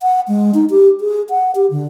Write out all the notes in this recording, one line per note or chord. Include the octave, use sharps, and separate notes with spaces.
F#5
G#3
D#4
G4
G#4
F#5
G4
D3